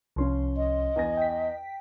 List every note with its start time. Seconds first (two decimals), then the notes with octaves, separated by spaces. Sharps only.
0.16 C2 F3 C#4 F4 C6
0.57 D#5
0.96 E2 G#5 A#6
1.17 G5 B6